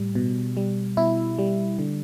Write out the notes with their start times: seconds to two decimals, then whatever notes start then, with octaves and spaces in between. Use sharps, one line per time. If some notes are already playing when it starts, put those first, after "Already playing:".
Already playing: A2 G3
0.15 B2
0.57 G3
0.97 B2 E4
1.38 G3
1.79 D3